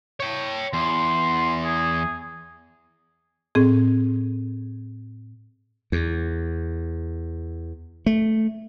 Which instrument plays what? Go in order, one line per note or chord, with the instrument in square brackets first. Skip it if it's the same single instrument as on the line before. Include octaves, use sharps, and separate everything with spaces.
[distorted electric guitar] C#5 G5
[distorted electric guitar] E2 [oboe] C6
[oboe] G#4
[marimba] A2 C4 G#4
[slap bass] E2
A3